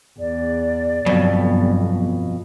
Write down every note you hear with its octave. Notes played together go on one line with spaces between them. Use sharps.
E2 D5
G1 F2 B2 F#3